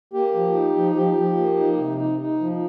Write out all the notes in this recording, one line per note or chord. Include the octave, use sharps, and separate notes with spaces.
A#3 G4
F3
D#4
F3
F3 G4
F3
A#3
D#4
C3
D#4
D#4
F3